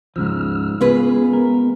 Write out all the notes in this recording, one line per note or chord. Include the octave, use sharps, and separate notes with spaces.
D2 G#2 C#3 F3 E6 F6
C#3 G#3 B3 F4 G#4 B4
A#4